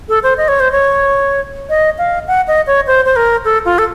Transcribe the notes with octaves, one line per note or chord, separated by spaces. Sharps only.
A4
C5
D#5
C#5
C5
C#5
D#5
F5
F#5
D#5
C#5
C5
C5
A#4
A4
F4
A4